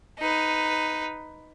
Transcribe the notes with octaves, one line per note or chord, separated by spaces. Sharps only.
D#4 B4